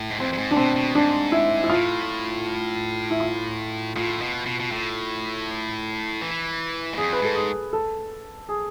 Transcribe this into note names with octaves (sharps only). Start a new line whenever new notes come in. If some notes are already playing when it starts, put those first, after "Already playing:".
Already playing: A2
G#2
F2 C4
F2
G#2
D4
B2 C4
B2
G#2 D4
E4
E4
A2 F4
E4
F4
A2 F4
B2
B2
B2
A2
E3
G#2
F2 G#4
B4
G#2 A4
G#4
A4
G#4